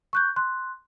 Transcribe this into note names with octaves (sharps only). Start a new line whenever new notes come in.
C#6 F#6 G6
C6 F#6